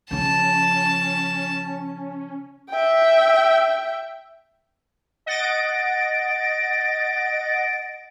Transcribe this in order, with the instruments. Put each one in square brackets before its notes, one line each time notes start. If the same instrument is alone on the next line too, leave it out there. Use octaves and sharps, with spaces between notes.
[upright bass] C#3 F3 [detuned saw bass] C#4 [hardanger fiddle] A5
[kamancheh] E5 G5
[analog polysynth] D#5 F#5 A6 A#6 D7